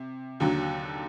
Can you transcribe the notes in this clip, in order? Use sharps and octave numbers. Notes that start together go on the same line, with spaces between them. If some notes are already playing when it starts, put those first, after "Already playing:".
Already playing: C3
D#2 D3 F#3